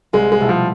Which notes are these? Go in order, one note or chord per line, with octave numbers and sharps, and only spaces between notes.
C2 G#3
G#3
B2 A3 E4
F3